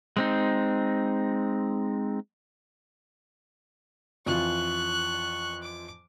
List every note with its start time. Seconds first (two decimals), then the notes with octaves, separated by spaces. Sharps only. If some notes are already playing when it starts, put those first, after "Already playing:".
0.17 G#3 C4 D#4
4.26 F2 E3 F4 C#6 F#6
5.62 D6